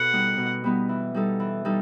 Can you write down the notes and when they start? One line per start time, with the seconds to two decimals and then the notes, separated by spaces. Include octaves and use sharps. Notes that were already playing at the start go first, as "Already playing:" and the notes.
Already playing: B2 A4 F#5
0.13 G3 B3 D#4
0.38 B2
0.64 G3 B3 D#4
0.89 E3
1.14 G3 D#4 A4
1.40 E3
1.65 G3 D#4 A4